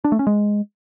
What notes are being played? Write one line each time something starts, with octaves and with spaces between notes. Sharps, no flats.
D4
A3
C#4
G#3